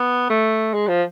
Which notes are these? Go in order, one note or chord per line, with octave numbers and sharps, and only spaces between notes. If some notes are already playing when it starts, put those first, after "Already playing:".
Already playing: B3
A3
G#3
F3